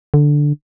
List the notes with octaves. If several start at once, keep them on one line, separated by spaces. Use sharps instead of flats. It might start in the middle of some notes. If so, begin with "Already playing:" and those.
D3